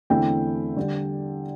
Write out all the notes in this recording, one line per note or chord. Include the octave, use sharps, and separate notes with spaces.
E2 D3 A3 C4 E4 G5
D3 G3 D4